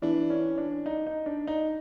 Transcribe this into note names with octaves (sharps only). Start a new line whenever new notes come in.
E3 D4
C#4
D4
D#4
D#4
D4
D#4